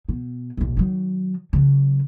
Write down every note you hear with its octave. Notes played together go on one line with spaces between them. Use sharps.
B2
D#1 B1
D#3 F#3
C#3 F#3